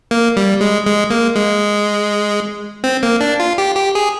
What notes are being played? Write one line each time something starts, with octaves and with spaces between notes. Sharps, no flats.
A#3
G3
G#3
G#3
A#3
G#3
C4
A#3
D4
F4
G4
G4
G#4